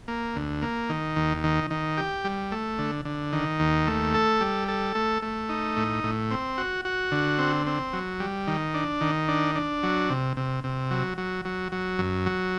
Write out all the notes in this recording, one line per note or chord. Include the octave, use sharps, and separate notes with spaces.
A#3
D2
A#3
D#3
D#2
D#3
D#3
G4
G3
A3
D3
D3
D#3
D#2
A3
A4
G3
A4
A3
A3
D#4
A2
A2
C4
F#4
F#4
D3
C4
C4
F#3
G3
D#3
D4
D#3
D4
D4
F#3
C3
C3
C3
F#3
F#3
F#3
F#3
F#2
F#3